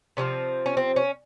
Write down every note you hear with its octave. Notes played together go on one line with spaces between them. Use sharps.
C3 F3 C4 C#4
C#4
C4
C#4